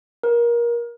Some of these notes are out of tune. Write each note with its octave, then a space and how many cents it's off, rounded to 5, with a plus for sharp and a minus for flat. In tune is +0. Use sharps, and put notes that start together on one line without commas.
A#4 +25